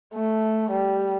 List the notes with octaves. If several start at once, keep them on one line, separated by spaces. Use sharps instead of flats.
A3
G3